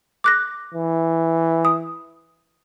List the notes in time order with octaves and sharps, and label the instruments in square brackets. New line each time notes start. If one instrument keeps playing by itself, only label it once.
[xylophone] D6 F#6 A#6
[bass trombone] E3
[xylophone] D#6